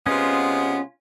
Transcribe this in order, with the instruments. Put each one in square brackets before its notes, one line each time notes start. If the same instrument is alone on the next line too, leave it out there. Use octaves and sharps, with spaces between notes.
[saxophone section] C3 G#3 B3 [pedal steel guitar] C#4 F4